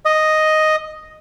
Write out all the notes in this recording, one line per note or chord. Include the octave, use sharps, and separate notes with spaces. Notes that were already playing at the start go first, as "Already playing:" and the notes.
D#5